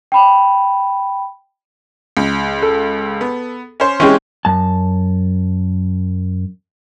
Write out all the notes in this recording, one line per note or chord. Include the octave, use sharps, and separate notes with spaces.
G5 B5
C#2
A4
B3
C#4 C5
E3 G#3 C4 C#4 G4
F#2 A5